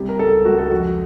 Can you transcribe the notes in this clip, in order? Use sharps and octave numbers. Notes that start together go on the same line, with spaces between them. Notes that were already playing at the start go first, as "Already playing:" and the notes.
Already playing: C2 C3
A#4
C#2 A4
C#2 F#4
A4
F2 F#4